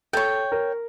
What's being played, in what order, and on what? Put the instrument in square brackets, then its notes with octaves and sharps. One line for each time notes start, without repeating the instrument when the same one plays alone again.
[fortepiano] A4 [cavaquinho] C#5 G5
[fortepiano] A#4